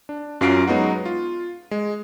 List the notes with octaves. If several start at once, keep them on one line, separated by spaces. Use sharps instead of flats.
D4
F#2 F#3 C#4 F4 C7 D7
F#3 G#3 B3 D#4 F#4
F4
G#3